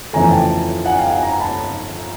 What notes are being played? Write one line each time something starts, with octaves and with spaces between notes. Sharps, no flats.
F2 C#3 E3 A3 G#5 A#5
G5 A5
F#5 G#5
F5 G5
F#5 G#5
G#5 A#5
A5 B5